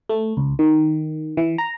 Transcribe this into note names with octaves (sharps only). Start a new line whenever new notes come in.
A3
C#2
D#3
E3
A#5